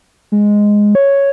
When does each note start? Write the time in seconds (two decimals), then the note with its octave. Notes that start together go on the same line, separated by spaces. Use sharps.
0.32 G#3
0.95 C#5